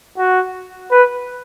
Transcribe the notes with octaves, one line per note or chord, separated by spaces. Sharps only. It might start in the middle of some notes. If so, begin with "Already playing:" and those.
F#4
B4